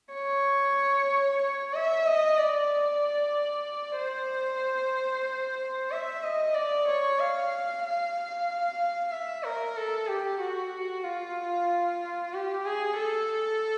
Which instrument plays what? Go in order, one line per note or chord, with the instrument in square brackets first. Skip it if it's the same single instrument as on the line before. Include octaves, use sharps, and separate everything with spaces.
[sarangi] C#5
C#5
E5
D#5
D5
C5
E5
D#5
D5
C#5
F5
F5
E5
A#4
A4
G4
F#4
F4
G4
G#4
A4